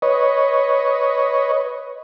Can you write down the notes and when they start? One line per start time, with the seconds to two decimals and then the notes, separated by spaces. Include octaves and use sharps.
0.02 B4 C#5 D#5